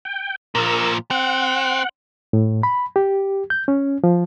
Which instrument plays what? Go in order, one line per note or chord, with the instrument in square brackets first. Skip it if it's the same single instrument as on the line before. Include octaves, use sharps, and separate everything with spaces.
[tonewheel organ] G5
[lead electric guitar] A#2 F3 [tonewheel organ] A#4 E6
[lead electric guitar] C4 [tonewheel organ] F#5
[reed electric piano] A2
B5
G4
G6
C#4
F3